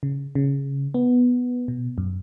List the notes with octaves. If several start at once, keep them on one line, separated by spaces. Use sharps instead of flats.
C#3
C#3
B3
B2
F#2